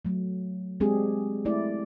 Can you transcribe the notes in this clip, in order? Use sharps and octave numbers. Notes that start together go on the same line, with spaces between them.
F#3 A3
G#3 C4 D4 G4 G#4
A3 E4 D5